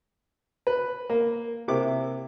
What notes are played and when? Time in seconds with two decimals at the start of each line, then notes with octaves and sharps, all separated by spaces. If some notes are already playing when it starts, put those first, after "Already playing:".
0.67 B4
1.10 A#3
1.68 C3 A#3 E4 D6